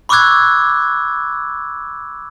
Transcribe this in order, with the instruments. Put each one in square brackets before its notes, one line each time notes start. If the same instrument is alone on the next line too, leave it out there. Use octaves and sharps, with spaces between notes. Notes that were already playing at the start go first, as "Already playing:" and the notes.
[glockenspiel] B5 C#6 D6 E6 F#6 G#6